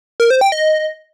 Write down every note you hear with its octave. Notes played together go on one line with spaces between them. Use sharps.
A#4
C5
G5
D#5